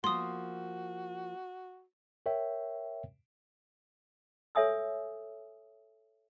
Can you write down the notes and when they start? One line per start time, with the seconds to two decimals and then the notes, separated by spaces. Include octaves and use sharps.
0.04 F3 A#3 F#4 C6 D#6
2.26 A#4 C#5 E5 G5
4.55 A4 C#5 E5 G#5 D#6 E6